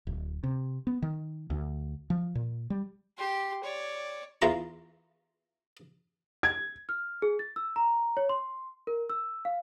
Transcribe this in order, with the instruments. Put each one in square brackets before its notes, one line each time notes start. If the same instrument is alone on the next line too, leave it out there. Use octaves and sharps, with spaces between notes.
[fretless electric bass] D1
C3
B3
D#3
D2
F3
A#2
G3
[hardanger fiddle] G4 C6
C#5 D5
[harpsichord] E2 E3 F4 A#5 C#6
[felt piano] G#6
[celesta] F6
G#4
A6
E6
A#5
C#5
C6
A#4
E6
F5